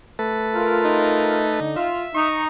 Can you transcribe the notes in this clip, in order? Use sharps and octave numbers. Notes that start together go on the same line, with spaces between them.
A3 A4 B4
F4 A#4
D#4
D3
F4 E5
D#4 C#6